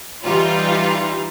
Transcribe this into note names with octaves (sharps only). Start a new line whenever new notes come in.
E3 G3 D#4 F4